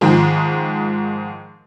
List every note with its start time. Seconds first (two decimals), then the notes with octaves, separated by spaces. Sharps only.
0.01 G#2 D#3 F3 G#3